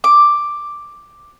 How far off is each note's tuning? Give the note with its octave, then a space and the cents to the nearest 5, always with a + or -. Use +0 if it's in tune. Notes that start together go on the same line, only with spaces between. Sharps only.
D6 +5